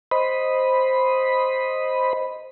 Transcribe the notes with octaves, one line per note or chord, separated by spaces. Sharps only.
C5 D#5 B5